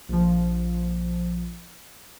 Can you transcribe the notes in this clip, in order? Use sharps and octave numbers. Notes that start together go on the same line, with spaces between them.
A#1 F3